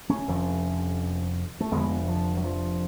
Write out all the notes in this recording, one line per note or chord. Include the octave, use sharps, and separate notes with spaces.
A3 C#4
F1 F2 D3
A3
F1 F2 D3 G#3 B3
F3
F#3
F3